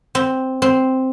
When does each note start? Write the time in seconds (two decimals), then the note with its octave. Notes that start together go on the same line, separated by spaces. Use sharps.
0.15 C4
0.62 C4